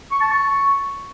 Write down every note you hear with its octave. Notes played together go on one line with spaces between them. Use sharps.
C#6
A5
C#6